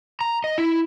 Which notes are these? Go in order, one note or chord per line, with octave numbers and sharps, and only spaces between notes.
A#5
D#5
E4